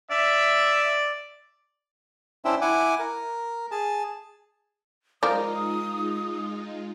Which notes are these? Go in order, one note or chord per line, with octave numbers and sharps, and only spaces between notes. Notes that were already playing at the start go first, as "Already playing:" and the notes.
D5 E5
C#4 D4 E4 C5 E5 G5
E4 F#5 G#5 D6
A#4
G#4 A5
F3 G#3 D#4 F4 A#4 D5 A#5 D#6